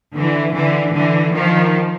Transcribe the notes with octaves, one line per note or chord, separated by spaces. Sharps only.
D3 E3
D3 E3
D3 E3
D#3 F3